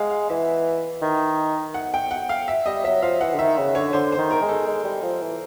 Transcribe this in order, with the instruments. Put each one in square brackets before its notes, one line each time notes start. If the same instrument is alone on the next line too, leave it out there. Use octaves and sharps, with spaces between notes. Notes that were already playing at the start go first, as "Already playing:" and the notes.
Already playing: [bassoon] G#3 [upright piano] F5 F#5
[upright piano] F5
[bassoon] E3 [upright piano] E5
[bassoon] D#3
[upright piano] F#5
G5
F#5
F5
E5
[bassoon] G3 [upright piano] D#5
[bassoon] F#3 [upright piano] E5
[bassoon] F3 [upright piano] F5
[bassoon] E3 [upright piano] F#5
[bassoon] D3
[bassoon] D#3 [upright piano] E5
[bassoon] C#3
[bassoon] D3 [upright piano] C#5
[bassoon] D3 [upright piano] C5
[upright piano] C5
[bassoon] D#3
[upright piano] A#4
[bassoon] G#3
[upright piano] A4
[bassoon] G#3
G3
F3
E3